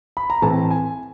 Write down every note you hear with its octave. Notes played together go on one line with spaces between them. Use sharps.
B5
A#5
A2 E3 A3 C4 A5
G#5